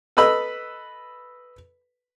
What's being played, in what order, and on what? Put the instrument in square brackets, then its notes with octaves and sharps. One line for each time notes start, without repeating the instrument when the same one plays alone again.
[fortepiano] A4 B4 D#5 B5 E6